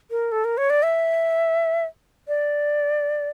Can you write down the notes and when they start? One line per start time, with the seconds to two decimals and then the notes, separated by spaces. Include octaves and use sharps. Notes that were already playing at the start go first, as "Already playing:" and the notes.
0.11 A#4
0.32 A4
0.45 A#4
0.58 C#5
0.70 D5
0.83 E5
2.28 D5